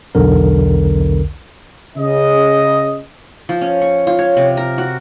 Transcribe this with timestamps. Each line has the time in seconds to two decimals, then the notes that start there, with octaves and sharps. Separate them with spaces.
0.15 B1 E2 D3 A#4
1.97 C#3 D#5
3.49 F3
3.61 C#4
3.82 C#6
4.07 F4
4.19 C#5
4.37 C3
4.57 A#4
4.78 F#4